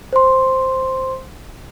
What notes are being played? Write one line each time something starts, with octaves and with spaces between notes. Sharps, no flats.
C5 C6